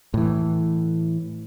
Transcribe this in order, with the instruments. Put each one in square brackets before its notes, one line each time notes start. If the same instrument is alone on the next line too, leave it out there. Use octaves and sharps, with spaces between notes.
[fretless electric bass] A2 E3